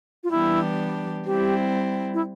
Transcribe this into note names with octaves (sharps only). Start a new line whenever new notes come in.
F4
E3 G3 B3 D4 E4 G4
G3 C4 E4 G4
E4